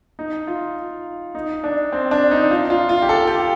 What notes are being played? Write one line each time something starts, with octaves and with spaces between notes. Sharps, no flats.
D#4
F4
D#4
D4
C4
D4
D#4
F4
F4
F4
G4
A4
G4